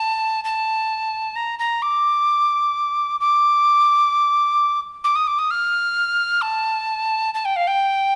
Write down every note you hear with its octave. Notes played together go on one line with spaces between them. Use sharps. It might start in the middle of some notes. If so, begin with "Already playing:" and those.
Already playing: A5
A5
A#5
A#5
D6
D6
D6
D#6
D6
D#6
F6
A5
A5
G5
F5
G5